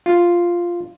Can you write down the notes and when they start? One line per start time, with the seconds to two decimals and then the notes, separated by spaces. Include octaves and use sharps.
0.06 F4